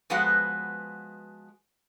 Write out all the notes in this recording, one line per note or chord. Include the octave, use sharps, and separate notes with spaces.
F3 G#3 B3 F#4 B4 F#5